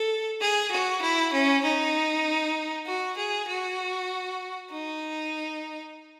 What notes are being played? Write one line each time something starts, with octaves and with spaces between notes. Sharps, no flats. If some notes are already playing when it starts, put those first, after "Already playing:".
Already playing: A4
G#4
F#4
E4
C#4
D#4
F#4
G#4
F#4
D#4